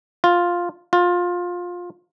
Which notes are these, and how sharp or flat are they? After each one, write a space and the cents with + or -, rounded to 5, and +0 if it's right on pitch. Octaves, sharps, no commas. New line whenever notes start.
F4 +5
F4 +20